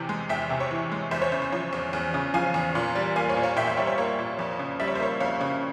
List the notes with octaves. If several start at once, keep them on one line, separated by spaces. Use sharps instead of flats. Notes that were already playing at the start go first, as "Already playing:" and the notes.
Already playing: E2 C3 E3 G5
G#3
E2 E5 G5
C3
C#5
E3
G#3
E2 C5 E5
C#5
C#3 C5
C5
F3 C#5
E2
E2
C#3
F3 F5 G#5
E2
A#2
G3
A#3 F5 G#5
C#5 F5
A#2
C#5 F5
A#2 E5 G5
C5 E5
G3 C#5
C#5
A#3 C#5
A#2
F2
C#3
G3 E5
C#5
C5
A#3 C#5
F2 C#5 F5
C#3